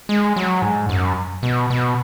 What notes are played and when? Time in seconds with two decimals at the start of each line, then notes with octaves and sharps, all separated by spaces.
0.09 G#3
0.36 F#3
0.62 G#2
0.89 F#2
1.43 B2
1.70 B2